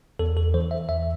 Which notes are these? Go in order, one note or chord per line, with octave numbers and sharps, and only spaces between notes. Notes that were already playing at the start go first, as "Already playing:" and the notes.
E2 A4
A4
E3 C5
E5
E2 E5